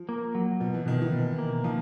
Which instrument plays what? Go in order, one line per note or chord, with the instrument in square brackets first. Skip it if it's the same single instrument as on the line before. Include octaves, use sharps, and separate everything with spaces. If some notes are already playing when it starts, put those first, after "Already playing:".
Already playing: [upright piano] F3
[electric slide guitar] A#3
F#3
[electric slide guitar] B2 [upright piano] F3
[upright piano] E3
[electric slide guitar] B2 [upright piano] D#3
[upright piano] E3
[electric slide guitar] B2
A#3
[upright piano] D#3 [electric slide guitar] F3